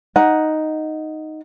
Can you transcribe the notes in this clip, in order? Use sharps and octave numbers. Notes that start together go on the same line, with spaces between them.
D#4 F#5